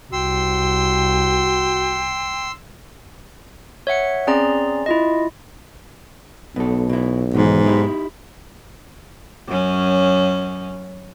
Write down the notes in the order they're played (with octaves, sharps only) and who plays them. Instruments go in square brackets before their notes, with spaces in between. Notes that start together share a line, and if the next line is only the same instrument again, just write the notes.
[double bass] C2 [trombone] F#4 [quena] G5 [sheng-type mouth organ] C6 E6
[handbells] C#5 E5 F#5 C#7
C4 C#4 G#4 D5 A#5 C6
E4 F4 D#5
[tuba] B1 [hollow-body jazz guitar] B2 A4
[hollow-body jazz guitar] B2 E4
[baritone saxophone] G#2 [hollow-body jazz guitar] B2 D#3 E3
[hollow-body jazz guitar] D#4 E4 G4
[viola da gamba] F#2 C#4